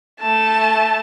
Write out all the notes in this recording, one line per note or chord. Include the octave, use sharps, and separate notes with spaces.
A3 A5